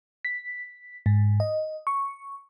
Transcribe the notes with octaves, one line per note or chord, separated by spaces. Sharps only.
B6
G#2
D#5
C#6